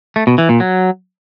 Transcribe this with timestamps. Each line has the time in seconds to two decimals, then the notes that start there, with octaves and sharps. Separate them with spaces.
0.16 A3
0.27 B2
0.38 E3
0.49 A#2
0.60 F#3